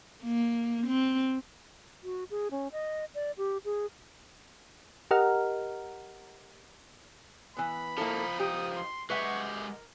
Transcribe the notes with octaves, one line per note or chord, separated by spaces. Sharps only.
A#3
C4
F#4
G#4
C#4
D#5
D5
G4
G#4
G4 A#4 D#5 F#5 A#5 F6
E3 B3 B5
F3 A#3 D#4 E4 A4
G4 D#6
C6
G#3 G4 B4 E5 F#5 C#6
A#4